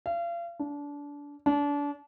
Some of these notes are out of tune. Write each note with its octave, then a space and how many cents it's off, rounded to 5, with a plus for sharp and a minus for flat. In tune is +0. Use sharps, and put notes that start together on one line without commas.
F5 -35
D4 -25
D4 -30